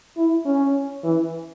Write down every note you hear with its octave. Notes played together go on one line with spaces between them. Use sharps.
E4
C#4
E3